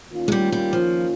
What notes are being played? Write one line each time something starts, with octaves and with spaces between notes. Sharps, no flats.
D#3 A#3 C#4 F4
G#3
G3
G3
F3